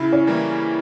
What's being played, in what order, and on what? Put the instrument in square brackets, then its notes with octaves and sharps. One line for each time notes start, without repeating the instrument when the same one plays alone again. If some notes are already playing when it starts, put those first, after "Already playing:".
Already playing: [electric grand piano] C#3 [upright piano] E4
[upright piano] C#4
[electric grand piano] E3 G3 A#3 E4